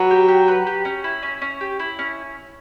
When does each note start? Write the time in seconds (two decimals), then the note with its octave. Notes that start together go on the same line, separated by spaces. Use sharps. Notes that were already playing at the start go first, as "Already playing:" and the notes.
Already playing: F#3 B4
0.11 G4
0.28 G4
0.48 B4
0.67 G4
0.85 C#4
1.04 E4
1.23 C#4
1.42 C#4
1.61 G4
1.79 E4
1.99 C#4